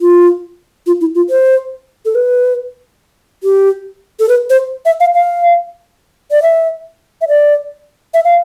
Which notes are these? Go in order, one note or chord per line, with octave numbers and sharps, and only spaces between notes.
F4
F4
E4
F4
C5
A4
B4
G4
A4
B4
C5
E5
F5
F5
D5
E5
E5
D5
E5
F5